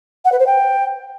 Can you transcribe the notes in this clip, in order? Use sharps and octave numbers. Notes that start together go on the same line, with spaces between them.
F#5
B4
C5
G5